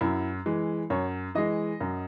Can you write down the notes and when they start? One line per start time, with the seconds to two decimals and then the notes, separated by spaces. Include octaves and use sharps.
0.01 F#2 E4
0.46 E3 G#3
0.90 F#2 C#5
1.35 E3 G#3 D#5
1.80 F#2